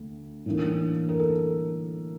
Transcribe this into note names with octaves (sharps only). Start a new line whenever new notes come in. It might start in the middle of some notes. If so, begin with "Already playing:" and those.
Already playing: D2 D3 A3
A2 E3 A#3 D4
A#4
A4